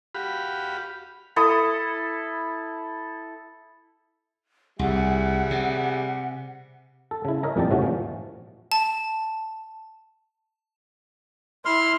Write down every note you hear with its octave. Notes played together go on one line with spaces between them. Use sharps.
F#4 G4 F5 B5
E4 A4 D#6
C2 G3 G#4 E5 F#5
C3
A4
C#3 E4
A#4 C#5 D#5 E5 G#5 A#5
F2 A#2 G3 E4 G4 A5
A2 C3 A3 C#4 F#4
A#2 F3
A5
E4 C6 F6